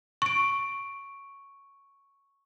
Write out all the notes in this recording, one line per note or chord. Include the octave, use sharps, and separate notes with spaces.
C#6 D7